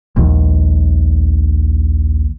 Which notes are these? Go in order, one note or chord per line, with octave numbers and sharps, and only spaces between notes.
A#1 D#2